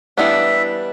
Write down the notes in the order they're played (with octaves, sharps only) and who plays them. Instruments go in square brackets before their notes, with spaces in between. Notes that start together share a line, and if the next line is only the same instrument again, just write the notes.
[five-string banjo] E3 G3 B3 D4 [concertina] E5